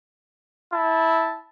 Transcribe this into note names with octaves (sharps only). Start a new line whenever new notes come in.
E4 A5